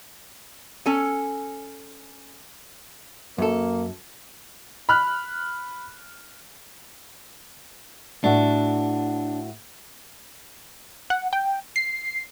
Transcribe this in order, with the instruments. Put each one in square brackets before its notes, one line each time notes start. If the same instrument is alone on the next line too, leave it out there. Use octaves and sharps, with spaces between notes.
[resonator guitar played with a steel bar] C#4 A4 G#5
[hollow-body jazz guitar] F#2 A4 [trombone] A#3
[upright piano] B5 F6 F#6
[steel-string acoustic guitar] A2 F#4 [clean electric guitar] D4
[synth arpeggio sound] F#5
G5
C7